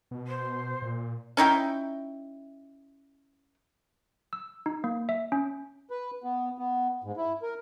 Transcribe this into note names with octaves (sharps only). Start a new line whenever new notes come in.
B2
C5
A#2
C#4 D#4 E4 G5
E6
D#4
A#3
E5
C#4
B4
B3
B3
G#2
E4
A#4